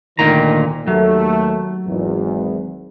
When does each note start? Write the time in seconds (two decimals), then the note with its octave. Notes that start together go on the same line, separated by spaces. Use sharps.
0.19 D2 A#2 D#3 A#5
0.87 D#2 F#3 A3
1.86 G#1 E2